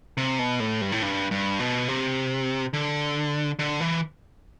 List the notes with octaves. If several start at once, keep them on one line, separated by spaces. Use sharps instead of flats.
C3
B2
A2
G2
A2
G2
G2
B2
C3
D3
D3
E3